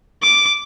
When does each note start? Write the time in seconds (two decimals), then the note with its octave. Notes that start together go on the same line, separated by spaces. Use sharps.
0.22 D6